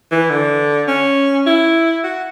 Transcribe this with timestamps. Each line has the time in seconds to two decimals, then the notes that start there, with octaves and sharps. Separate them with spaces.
0.12 E3
0.30 D3
0.88 C#4
1.46 E4
2.04 F#4